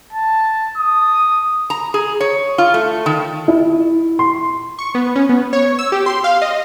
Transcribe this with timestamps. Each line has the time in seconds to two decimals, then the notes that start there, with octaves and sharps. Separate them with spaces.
0.13 A5
0.77 D#6
1.70 A#5
1.94 G#4
2.20 C#5
2.58 F4
2.74 A3
3.06 D#3
3.48 E4
4.19 C6
4.79 C#6
4.95 B3
5.16 C#4
5.29 B3
5.53 C#5
5.79 E6
5.92 G4
6.06 C6
6.24 F5
6.42 D#5